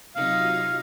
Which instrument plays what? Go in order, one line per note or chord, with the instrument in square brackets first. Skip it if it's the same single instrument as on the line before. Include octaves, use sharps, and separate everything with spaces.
[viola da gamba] C3 D#4 [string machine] F#3 F4 G#6 [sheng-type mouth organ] F5